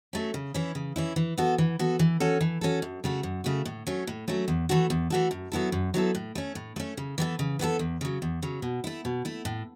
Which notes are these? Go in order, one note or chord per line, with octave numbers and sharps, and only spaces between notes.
F#3 A3 C#4
C#3
E3 C#4 E4
C#3
E3 C#4 E4
E3
B3 F#4 A4
E3
B3 F#4 A4
E3
C#4 F#4 A4
E3
C#4 F#4 A4
F#2
C#3 A3 F#4
F#2
C#3 A3 F#4
A2
F#3 A3 C#4
A2
F#3 A3 C#4
E2
E3 A3 F#4 A4
E2
E3 A3 F#4 A4
F#2
F#3 B3 E4 A4
F#2
F#3 B3 E4 A4
A2
A3 C#4
A2
A3 C#4
C#3
E3 B3 F#4 A4
C#3
E3 B3 F#4 A4
E2
C#3 F#3
E2
C#3 F#3
B2
A3 E4
B2
A3 E4
A2